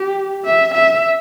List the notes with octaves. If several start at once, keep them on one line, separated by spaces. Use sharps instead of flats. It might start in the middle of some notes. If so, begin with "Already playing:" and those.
Already playing: G4
E5
E5